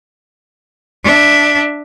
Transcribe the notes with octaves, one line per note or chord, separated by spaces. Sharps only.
D4 E5